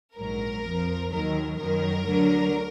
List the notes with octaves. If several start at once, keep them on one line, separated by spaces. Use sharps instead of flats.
A#1 G#2 F#3 A#4
F2 F3
D#2 D#3 F#3 A#4
F#2 D#3 F#3 A#4
D2 D3 F#3